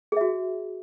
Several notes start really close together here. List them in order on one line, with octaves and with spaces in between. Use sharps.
G#4 E5 F#4